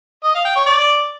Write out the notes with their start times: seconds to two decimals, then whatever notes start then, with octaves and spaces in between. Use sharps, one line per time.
0.24 D#5
0.35 F5
0.45 G5
0.56 C#5
0.66 D5